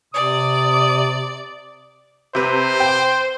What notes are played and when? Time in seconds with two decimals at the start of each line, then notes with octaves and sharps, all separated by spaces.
0.14 C3 D5 D#6
2.35 C3 B4 C5
2.80 G5